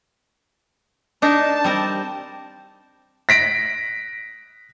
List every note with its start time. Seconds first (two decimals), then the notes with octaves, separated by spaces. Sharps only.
1.22 D4 D#4 A#4 A5
1.64 G3 C4 A#4
3.29 A#6 B6 D7